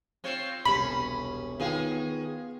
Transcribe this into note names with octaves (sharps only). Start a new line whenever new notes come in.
C4 F4 C#5
E1 C2 C#4 B5
D#3 B3 F4 G#4 G5